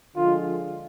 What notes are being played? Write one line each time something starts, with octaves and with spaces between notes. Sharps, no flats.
D3 F3 G#3 F4